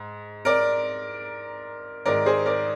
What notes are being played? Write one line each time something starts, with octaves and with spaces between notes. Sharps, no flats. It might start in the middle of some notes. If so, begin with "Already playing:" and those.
Already playing: G#2
A#4 D5
G#2 D#3 G#3 A#4 D5
G#4 C5
A#4 D5